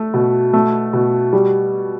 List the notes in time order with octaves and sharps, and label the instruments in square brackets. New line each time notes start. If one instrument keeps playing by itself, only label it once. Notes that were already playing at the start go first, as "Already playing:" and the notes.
Already playing: [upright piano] A3
B2
A3
B2
G3